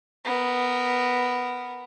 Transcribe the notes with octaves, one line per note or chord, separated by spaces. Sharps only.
B3 A#4